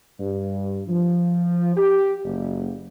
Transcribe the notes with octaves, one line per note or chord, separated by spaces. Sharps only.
G2
F3
G4
F#1